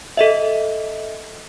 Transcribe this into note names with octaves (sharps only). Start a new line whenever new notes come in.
A4 D#5 E5